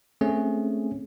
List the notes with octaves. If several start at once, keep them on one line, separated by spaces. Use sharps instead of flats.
A3 C4 C#4 G#4